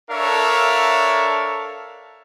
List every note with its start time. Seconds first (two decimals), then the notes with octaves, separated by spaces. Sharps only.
0.10 D4 A4 A#4 C#5 E5 F5